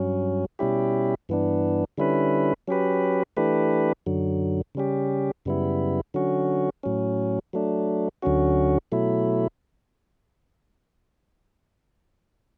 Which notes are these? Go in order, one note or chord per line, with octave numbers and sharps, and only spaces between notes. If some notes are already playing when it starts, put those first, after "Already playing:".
Already playing: G2 F#3 C#4
B2 G3 C#4 E4 G4
G2 E3 B3 D4
D3 G3 C#4 E4 B4
F#3 C#4 G4 B4
E3 A3 D4 G4 B4
F#2 D3 F#3
C#3 G3 C#4 G4
F#2 C#3 G3 B3 E4
D3 F#3 C#4 F#4
A2 F#3 C#4
F#3 A3 D4
D2 D3 F#3 C#4 F#4
B2 F#3 A3 E4